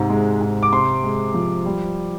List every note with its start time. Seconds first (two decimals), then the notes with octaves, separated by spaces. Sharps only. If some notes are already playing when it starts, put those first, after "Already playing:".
Already playing: G#2 C3
0.10 G#3
0.41 G#2
0.62 D6
0.72 C3 C6
1.03 G#3
1.34 F3
1.65 G3